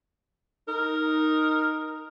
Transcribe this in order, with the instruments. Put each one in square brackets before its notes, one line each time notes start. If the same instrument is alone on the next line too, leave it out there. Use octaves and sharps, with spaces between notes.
[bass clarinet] D#4 [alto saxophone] A#4